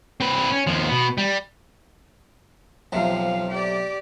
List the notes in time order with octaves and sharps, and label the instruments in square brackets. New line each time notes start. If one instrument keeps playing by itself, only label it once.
[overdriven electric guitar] C4 B4
C#4
D#2 F3
B2 B3
G3
[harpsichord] B1 C3 [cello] F3 F5
[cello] G4 D5